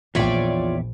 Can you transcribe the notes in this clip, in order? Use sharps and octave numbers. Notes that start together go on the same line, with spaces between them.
A#1 E2 F4 C#5 D5 E5 G5